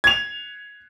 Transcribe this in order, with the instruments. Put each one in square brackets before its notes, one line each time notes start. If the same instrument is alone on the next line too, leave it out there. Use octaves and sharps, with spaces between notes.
[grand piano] G#6 F7